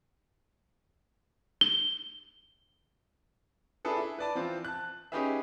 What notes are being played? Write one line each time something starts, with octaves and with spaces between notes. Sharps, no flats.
G7
D4 E4 G#4 A4 B4
E4
B4 D5 A5
E3 F3 C4 F4
A5 F#6
C#4 D#4 G4 G#4 B4 E5